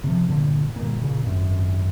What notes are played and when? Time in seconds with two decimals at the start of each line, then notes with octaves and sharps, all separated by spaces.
0.04 C3 E3 F3
0.27 G1 A#2 D3
0.76 G1 A#2
1.02 A#2 C#3
1.22 G#1 F#2